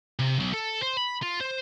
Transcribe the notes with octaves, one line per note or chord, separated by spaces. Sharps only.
C3
B1
A4
C5
B5
F4
C5